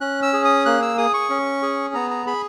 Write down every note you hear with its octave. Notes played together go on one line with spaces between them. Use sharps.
C#4 F#6
E6
G#4
D#6
A#3 F#6
E6
G#4 D#6
C#6
C#4
G#4
B3 A#5
A#5
G#4 B5